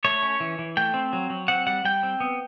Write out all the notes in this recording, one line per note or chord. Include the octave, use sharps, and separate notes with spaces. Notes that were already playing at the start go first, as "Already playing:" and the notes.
A3 C#5
C#4
E3
E3
A3 G5
C4
F#3
F#3
C4 F#5
G3 F#5
G3 G5
C4
B3